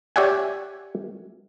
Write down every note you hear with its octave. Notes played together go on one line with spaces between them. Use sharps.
G4 C#5 D5 E5 F#5 G#5